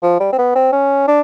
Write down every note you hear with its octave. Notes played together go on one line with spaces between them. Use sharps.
F3
G3
C4
B3
C4
C#4
D4